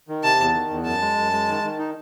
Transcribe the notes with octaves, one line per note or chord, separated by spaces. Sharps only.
D#3
C3 A5
E2
D#3
E2
F#2 A5
G#3
F#2
G#3
D#3
D#3
D#4